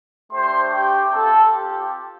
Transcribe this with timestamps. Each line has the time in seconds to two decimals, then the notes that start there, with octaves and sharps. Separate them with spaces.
0.32 A3 D4 G4 C5 C6
0.72 G4 G5
1.13 C4 F4 A4
1.52 G4